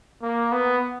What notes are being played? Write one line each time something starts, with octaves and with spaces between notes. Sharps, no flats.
A#3
B3